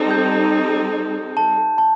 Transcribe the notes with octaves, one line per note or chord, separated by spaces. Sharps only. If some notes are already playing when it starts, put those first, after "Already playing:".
Already playing: G3 C4 D#4 A4
G6
A5
A5